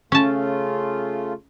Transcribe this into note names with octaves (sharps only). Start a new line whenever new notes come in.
C#3 A3 C#4 F4 A5